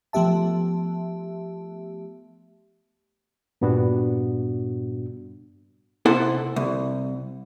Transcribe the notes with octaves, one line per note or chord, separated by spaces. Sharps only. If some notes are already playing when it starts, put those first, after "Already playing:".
F3 A3 B3 G4 E5 A5
G2 A#2 G3 B3 D4 F#4
C3 E4 A4 C5 F#5
C2